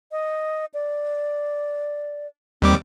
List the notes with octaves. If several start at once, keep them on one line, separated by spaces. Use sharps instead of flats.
D#5
D5
D#2 G3 C4 D6